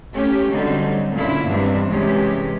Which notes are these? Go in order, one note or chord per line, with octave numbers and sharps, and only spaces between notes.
A3 C#4 G4
D3 F#3 G3 C4 C#4 D#4
A#2 D3 C#4 E4
E2 G2 D#3 G3 C4 D4
C3 E3 G#3 C#4 G4